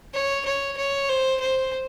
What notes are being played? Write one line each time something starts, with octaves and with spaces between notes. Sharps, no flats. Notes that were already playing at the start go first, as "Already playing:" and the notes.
C#5
C#5
C#5
C5
C5